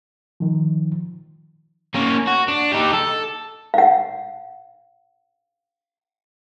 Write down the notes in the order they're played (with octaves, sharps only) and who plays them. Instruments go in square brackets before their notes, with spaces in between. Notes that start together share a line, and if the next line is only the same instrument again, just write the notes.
[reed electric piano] D#3 F3
[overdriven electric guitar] A#3 C#4
F#4
D4
D#4 G4
A4
[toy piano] F5 F#5